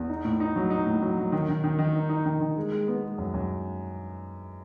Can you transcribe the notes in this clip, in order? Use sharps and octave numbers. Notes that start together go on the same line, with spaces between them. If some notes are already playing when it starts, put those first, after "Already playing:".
Already playing: E2
D#4
A2
D#4
F#3
D#4
A2
F#3
F#3
D#3
D#3
D#3
D#3
D#4
D#4
D#3
D#3
G#3
G#3
B3
G#3
F#2
F#2